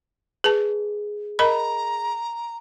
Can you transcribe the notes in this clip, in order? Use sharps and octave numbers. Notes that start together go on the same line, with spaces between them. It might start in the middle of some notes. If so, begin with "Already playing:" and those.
G#4 B4 A5
A#4 D#5 A#5 B5